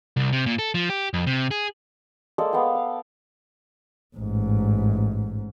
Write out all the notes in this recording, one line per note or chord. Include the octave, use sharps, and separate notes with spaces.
C2
C3
A#2
A4
F3
G4
F2
C3
G#4
G#3 A#3 A4 D5
B3 D5 F5 G5
F5
A1 G#2